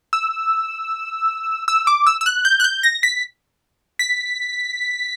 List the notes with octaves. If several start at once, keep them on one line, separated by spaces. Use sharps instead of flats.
E6
E6
D6
E6
E6
F#6
G6
F#6
G6
A#6
B6
B6